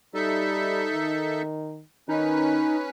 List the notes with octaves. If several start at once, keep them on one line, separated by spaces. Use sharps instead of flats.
G3 D#4 A4 E5
D#3
D#3 C#4 D#4 B4